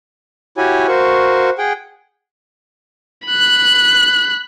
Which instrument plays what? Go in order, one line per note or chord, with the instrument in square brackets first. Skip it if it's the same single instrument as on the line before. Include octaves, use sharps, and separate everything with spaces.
[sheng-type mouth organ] E4 F#4 G4 C#5 G#5
F#4 A#4 C5 F5 C#6
G#4 F#5 G5
[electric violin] B5 F#6